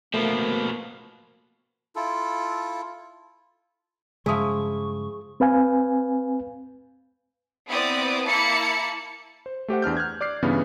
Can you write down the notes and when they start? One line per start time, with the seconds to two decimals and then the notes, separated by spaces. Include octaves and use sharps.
0.14 B2 F3 A3 A#3 A#4
1.96 E4 F4 A4
4.26 G2 C#3 F3 G#3 E4 G#4 C#6 D#6
5.40 C4 B4 F5 G#5
7.67 B3 C4 E4 D5 D#6
8.26 A#3 E4 E5 A5 B5 C#7
9.46 C5
9.68 A3 G4 C5 F#5
9.82 E2 D4 F6 G6
9.97 F6 F#6 G#6
10.21 D5 D6 F6 C7
10.43 G2 C#3 E3 B3